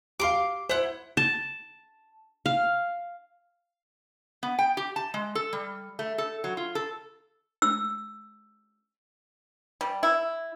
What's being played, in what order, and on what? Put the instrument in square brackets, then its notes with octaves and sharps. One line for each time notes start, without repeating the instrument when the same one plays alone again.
[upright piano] G4 F5 [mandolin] C6 D6
[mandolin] E4 F#5 [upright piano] C5
[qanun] A5
F5
[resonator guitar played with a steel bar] B3
G5
G4
A5
G#3
A4
G3
A3
A4
F#3
F4
A4
[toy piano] E6
[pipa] G3
E4